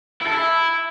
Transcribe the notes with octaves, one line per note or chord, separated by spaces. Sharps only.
E4
A4
E4